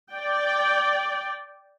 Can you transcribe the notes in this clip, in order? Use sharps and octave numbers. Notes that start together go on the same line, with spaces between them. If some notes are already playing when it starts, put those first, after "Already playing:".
D5 G5